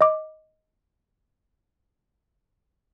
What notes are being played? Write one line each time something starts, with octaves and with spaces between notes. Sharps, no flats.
D#5 D6